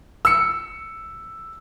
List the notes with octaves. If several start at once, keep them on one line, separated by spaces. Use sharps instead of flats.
E6 C#7